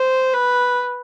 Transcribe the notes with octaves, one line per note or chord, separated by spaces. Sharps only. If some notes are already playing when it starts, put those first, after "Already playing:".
Already playing: C5
B4